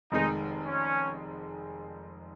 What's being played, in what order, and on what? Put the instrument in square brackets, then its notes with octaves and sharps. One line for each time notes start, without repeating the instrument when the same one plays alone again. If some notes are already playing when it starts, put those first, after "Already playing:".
[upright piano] F1 F2 D#3 G#3 [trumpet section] D#4
[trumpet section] C#4